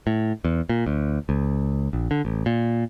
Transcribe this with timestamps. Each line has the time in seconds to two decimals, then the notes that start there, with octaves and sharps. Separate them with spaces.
0.07 A2
0.44 E2
0.69 A#2
0.86 D2
1.29 C#2
1.93 A#1
2.11 D3
2.25 A1
2.46 A#2